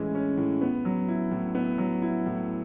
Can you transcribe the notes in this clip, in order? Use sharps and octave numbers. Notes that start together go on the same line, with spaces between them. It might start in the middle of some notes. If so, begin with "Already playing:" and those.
Already playing: A2 E3 G#3 C#4
C#4
A2
B3
F#3
E4
A2
B3
F#3
E4
A2